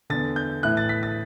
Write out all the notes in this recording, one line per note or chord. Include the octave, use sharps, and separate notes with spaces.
E2 D3 A6
G6
A2 E3 F#6
A6
B6
A6